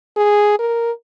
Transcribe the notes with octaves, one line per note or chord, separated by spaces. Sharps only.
G#4
A#4